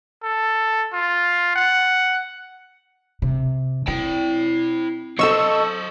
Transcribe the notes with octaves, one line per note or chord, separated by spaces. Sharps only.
A4
F4
F#5
C3
C4 E4 G5
F#3 A4 C5 D#5 C#6 E6